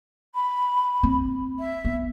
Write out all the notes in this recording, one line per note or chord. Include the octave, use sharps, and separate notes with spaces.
B5
C4
E5
B3